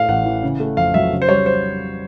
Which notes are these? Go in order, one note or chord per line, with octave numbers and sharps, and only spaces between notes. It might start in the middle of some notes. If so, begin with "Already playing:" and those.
Already playing: A2 A3 F5
A1 F#5
E3
C#3
A3
F2 F5
F#3 E5
C#3
C5
G3 C#5
C5